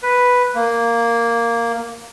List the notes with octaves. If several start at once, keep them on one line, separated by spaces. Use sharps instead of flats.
B4
A#3